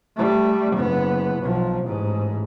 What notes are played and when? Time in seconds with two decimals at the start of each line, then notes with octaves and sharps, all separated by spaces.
0.16 G3 A3
0.77 F#1 B3
1.42 B1 F3
1.84 A1 G#2